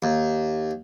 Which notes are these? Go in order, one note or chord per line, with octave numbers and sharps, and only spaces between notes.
D#2